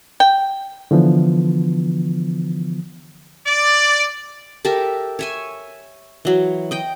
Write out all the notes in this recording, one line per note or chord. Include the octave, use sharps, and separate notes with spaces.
G5
D3 E3 F3 B3
D5
G4 A4 A#4 E5
C#5 E5 G#5
E3 F#3
D#5 G5